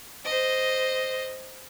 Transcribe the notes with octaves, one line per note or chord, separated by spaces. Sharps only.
C5 D#5